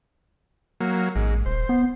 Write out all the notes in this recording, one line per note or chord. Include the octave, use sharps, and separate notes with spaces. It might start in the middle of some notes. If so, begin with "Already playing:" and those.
F#3 A#3
A1 G#2
D#1 C5
B3